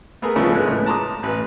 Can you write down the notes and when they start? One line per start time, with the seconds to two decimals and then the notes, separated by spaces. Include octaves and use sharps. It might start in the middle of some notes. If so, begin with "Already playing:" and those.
0.22 A3 B3 G#4 A#4
0.36 C#3 F3 G#3 A3 B3 C#4
0.52 G#1 G#3 B4 F#6
0.67 A2
0.86 A5 A#5 C6 D6 D#6
1.23 A1 B4